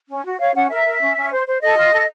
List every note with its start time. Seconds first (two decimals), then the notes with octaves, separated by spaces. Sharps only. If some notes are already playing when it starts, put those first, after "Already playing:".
0.08 C#4
0.25 F#4
0.40 C#5 F5
0.55 C#4 F#5
0.70 A#4 E5
0.86 A#4
1.00 C#4
1.16 C#4
1.31 C5
1.47 C5
1.62 A4 D#5
1.77 F4
1.92 A4